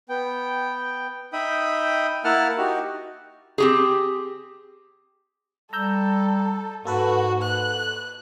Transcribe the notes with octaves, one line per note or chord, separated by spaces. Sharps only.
B3 G5
D#4 E5 G5 B5 D#6
A#3 E4 F#5 A5 F6
D#4 F#4 G4
C4 G4 G#4
G3 A4 A#5 E6 G6
G#2 A#3 F#4 A4 B4
F#6